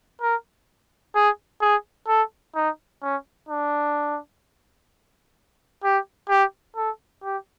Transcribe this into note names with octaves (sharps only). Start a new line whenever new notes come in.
A#4
G#4
G#4
A4
D#4
C#4
D4
G4
G4
A4
G4